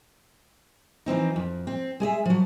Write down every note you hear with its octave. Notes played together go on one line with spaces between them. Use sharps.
E3 F3 C4 D#4
F2
C4
G#3 G#4 D#5 E5
F3 F#3